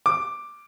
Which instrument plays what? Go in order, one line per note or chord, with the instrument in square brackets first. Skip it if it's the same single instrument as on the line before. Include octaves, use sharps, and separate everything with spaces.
[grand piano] D6